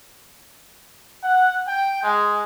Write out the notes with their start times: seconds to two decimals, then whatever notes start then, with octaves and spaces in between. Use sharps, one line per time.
1.24 F#5
1.68 G5
2.04 G#3